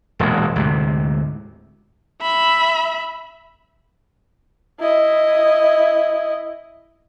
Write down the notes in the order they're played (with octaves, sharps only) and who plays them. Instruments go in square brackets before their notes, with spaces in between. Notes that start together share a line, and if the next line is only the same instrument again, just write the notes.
[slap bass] E1 A#1 D#2 G#3
D2 G#2 C3
[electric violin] E5 B5
[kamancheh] E4 D#5